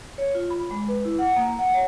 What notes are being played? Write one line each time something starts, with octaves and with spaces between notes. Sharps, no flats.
C#5
F4
B5
G#3
B4
E4
F#5
A#3
F#5
C#5